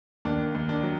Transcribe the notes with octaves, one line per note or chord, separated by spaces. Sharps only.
D#2 D4
D#2
D4
F#3